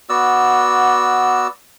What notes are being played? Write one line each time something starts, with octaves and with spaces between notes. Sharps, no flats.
B3 F#4 D5 E6